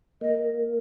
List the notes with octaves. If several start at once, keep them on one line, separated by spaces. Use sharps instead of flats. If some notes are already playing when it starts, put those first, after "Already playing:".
A#3 D#5